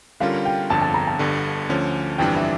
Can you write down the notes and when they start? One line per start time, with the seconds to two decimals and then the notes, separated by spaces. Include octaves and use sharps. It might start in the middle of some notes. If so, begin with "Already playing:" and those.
0.20 D3 G3 C#4 F4 A#4 F5
0.45 G5
0.70 G1 F2 D3 A5
0.82 A5
0.94 A#5
1.07 A5
1.19 G1 G2 D3
1.69 D2 D3 F3 C#4
2.18 G1 F2 E3 G3 D4 G5
2.36 E5